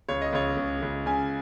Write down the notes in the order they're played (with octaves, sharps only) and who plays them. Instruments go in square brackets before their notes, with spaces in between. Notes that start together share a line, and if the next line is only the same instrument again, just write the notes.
[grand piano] C#2 C#5
D#5
C#2 C#5
C#2
C#2
C#3 G#5